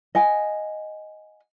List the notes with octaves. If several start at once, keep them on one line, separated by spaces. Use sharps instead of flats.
D#5 F#5 G#5